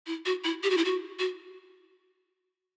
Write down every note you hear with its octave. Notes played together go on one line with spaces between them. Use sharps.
E4
F#4
E4
G4
F#4
E4
F#4
F#4